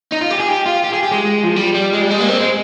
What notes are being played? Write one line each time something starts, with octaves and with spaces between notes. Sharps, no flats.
D#4
F4
G4
G#4
G4
F4
G4
G#4
G4
G#3
F3
G3
G3
G#3
G3
G#3
A#3
C4
G#3